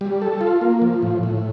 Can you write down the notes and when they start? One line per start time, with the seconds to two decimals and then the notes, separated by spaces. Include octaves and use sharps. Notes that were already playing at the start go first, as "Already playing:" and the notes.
0.01 G3
0.22 A4
0.41 F4
0.61 A#3
0.82 F3
1.02 A2
1.23 A2